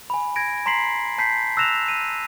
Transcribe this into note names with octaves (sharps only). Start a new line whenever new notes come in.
G#5 B5
G#6 A#6 D7
A#5 C6 B6 C7 F#7
A5 G6 B6 C7
E6 F#6 A#6 E7 F7
D#7